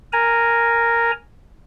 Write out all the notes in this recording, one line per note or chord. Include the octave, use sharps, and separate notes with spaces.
A#4 G#5 A#5